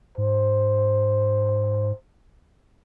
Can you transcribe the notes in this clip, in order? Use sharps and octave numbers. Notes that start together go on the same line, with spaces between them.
G#2 C5